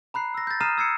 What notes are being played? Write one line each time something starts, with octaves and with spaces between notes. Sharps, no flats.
A#5 B5 F#6 C7
E6 A#6
G6 A6
A#5 D#6 F6 C7 D#7 E7
E6 G#6 C7 C#7